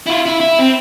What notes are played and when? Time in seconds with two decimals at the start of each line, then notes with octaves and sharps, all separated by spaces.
0.07 E4 F4
0.26 E4
0.41 E4
0.59 C4